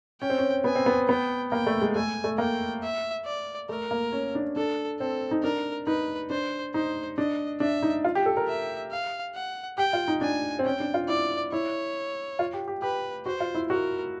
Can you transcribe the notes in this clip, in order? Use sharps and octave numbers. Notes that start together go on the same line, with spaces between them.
C#4 G5
C4
C#4
B3 G#5
C4
B3
B3 G5
A#3 G5
A3
G#3
A3 G#5
A3
A#3 G5
E5
D5
A3 A#4
A#3
C#4
D4
D4 A4
C4 A4
D#4
D4 A#4
D#4 B4
D4 C5
D#4 C5
D4 D#5
D4 E5
D#4
F4
G4
A4
A#4
E5
F5
F#5
G4 G5
F4
D#4
D4 G#5
C4
C#4 G5
D4
F4
E4 D5
E4 C#5
F4
G4
G4
G4 B4
F#4 C5
F4
E4
F#4 A#4